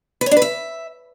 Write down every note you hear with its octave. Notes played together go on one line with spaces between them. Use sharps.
B4
C#5
D4
B4
E5